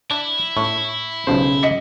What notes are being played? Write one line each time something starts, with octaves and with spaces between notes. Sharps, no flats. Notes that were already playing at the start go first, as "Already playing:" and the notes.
D4 E4
A2 C#6
B1 C#3 F3 C5
D#5 B6 C#7